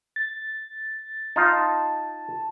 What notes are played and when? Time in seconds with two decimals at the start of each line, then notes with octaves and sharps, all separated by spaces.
0.16 A6
1.36 D#4 F4 A5